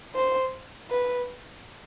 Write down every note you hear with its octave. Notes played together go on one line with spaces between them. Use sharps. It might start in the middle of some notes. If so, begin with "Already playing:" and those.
C5
B4